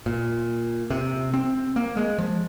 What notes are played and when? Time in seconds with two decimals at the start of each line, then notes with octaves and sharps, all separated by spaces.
0.06 A#2
0.90 C3
1.34 C4
1.76 A#3
1.97 G#3
2.18 F3